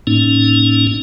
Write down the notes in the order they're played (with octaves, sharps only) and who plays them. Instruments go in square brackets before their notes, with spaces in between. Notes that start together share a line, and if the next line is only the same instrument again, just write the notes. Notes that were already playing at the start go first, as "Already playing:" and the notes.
[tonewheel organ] A2 A#3 C#4 D#4